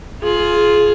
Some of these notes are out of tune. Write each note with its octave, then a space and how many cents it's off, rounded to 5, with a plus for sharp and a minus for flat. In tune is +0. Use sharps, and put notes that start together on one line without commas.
F4 +0 G#4 +20